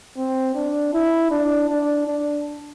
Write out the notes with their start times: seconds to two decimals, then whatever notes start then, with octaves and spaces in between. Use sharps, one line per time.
0.16 C4
0.55 D4
0.93 E4
1.31 D4
1.70 D4
2.07 D4